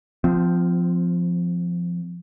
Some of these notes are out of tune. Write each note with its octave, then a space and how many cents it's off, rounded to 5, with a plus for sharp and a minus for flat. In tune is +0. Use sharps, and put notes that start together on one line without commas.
F3 +0 C4 -25